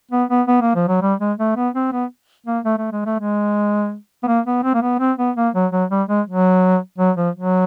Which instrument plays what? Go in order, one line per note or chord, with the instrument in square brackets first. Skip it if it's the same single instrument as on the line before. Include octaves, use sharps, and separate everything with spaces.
[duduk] B3
B3
B3
A#3
F3
F#3
G3
G#3
A3
B3
C4
B3
A#3
A3
A3
G#3
A3
G#3
B3
A#3
B3
C4
A#3
B3
C4
B3
A#3
F#3
F#3
G3
G#3
F#3
F#3
F3
F#3